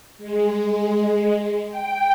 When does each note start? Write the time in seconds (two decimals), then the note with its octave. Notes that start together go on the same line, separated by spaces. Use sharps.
0.18 G#3
1.71 G5